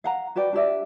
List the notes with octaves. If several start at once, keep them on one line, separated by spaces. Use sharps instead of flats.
F5 F#5 A#5
F#4 B4 D5 G5
D4 G4 D5 E5